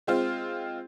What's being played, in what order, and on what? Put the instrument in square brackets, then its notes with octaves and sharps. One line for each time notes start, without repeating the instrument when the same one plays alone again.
[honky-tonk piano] G#3 C4 F4